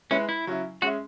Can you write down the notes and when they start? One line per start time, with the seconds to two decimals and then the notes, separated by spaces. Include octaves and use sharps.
0.11 G#3 C#4 E4 B4 E5
0.29 E4
0.47 C#3 F#3 C#4 E4
0.82 G#3 C#4 F#4 G#4 E5